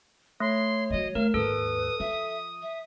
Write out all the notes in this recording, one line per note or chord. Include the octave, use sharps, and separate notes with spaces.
A3 C#5 C6
E3 F#3 D#5
A3 A#4 F5
D#2 G#2 A4 B4 D#6
F3 E5
E5